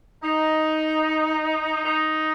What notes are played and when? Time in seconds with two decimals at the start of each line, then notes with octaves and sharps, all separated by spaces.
0.23 D#4
1.85 D#4